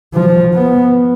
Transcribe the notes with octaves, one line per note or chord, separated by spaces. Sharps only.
F3
B3